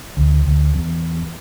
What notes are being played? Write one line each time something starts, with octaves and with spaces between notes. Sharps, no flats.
D2
D2
E2